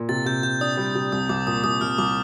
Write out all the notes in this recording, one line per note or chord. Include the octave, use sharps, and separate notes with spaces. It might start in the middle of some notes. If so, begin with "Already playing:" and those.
Already playing: A#2
C3 A6
C3 G6
C3 G6
D4 D#6
G3
C3
C2 D#6
C2 D6
A#2 D#6
C2 D#6
C2 F6
C2 D6